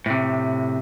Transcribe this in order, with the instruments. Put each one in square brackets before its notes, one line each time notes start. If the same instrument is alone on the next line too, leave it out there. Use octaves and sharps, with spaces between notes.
[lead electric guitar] A2 C3